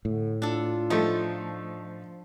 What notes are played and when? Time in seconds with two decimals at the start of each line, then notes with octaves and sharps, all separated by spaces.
0.05 A2 D3
0.42 D4 F4 A4
0.90 F3 A3 D#4